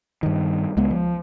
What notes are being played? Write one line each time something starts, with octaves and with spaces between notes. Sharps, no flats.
G2 D#3
C#2 G#3 B3
F3